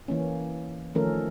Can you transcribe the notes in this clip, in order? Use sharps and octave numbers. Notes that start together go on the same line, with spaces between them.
E3 A#3 C#4
D#3 F3 A3 C#4 A4 A#4